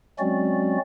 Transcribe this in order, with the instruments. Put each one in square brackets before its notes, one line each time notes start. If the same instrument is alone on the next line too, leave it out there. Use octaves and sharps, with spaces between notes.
[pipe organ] F#3 G#3 C4 C#4 F#4 D5